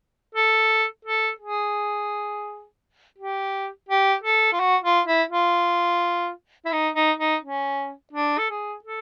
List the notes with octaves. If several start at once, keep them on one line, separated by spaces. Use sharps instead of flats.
A4
A4
G#4
G4
G4
A4
F4
F#4
F4
E4
F4
E4
D#4
D#4
D#4
C#4
D4
A4
G#4
A4